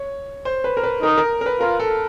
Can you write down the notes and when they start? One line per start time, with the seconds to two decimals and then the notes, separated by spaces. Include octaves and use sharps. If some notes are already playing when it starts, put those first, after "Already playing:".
Already playing: C#5
0.45 C5
0.64 B4
0.77 A#4
0.83 B4
1.03 D#4 A#4
1.17 A#4
1.41 A#4
1.46 B4
1.60 F4 A#4
1.80 A4